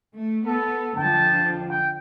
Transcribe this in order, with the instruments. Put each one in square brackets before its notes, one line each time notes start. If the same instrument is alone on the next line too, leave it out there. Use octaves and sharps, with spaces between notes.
[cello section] A3
[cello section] B3 [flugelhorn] A4
[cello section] F2 D3 F3 [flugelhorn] G5 [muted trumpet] A5
[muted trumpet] G5